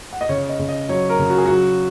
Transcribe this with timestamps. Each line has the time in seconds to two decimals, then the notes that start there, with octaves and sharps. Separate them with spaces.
0.13 F#5
0.21 D#5
0.29 C#3 C#5
0.49 D#5
0.59 C#3
0.69 D#5
0.89 F#3 C#5
1.10 A#4
1.19 C#3
1.30 F#4
1.38 G#4
1.46 F#3 F#4